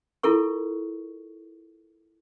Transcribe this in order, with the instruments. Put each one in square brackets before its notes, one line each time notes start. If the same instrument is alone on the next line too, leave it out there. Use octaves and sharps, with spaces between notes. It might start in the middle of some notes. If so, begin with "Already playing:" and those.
[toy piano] E4 F4 A4 A#4 C#6